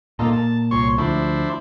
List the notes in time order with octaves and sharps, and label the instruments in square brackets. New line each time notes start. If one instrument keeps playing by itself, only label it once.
[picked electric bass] A#2 A#3 [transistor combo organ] D#4 F4 A4
[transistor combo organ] A5
[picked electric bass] C2 A#2 [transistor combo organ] C#5 C6 C#6
[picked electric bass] D2 F3 [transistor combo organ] D4 E4 C5